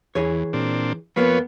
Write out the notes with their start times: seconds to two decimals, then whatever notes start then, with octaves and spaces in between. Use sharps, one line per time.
0.15 E2 E3 G#4 C#5
0.53 A#2 C4 D4
1.16 F2 F3 A#3 B3 B4 C#5